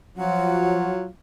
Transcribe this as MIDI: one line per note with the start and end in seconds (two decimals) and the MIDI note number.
0.17 0.93 53
0.17 1.07 54
0.17 1.07 65
0.17 0.91 78